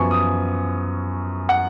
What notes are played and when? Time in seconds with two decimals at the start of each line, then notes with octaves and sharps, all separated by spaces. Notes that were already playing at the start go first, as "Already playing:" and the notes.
Already playing: F#2 F3 B3 G#5 C#6
0.11 D#6
1.49 F#5